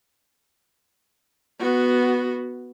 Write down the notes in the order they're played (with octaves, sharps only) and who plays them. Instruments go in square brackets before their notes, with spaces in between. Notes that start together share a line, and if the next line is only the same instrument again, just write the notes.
[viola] B3 F#4